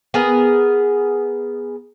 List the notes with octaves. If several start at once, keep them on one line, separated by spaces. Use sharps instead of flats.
B3 G#4 A#4